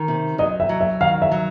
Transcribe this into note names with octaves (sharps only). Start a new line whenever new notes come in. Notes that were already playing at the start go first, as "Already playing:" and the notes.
Already playing: D#3
C3
F#3 D#5
E5
F#3
E5
D#3 F5
E5
F#3